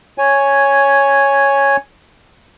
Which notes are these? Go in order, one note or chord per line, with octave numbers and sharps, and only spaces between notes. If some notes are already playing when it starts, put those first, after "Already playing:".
C#5 G#5